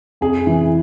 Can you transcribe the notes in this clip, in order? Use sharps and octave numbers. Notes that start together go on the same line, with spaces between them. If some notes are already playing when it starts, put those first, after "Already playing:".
F2 G#4
E3